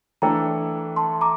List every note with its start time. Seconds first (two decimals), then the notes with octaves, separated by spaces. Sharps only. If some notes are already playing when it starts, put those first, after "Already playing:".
0.22 E3 A3 D4 A4 G5 A#5
0.96 A5 C6
1.21 A#5 D6